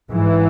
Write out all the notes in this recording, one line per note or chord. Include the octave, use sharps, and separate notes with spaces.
G#2 E3